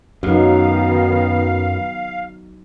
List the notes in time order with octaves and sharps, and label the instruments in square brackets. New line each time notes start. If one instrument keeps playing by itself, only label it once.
[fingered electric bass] F#2 [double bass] D#3 B3 [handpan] F#3 D#4 [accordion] F5